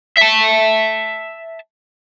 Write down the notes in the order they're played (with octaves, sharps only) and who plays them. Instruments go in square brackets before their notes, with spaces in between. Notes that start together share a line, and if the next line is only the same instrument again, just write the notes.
[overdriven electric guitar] E5 A5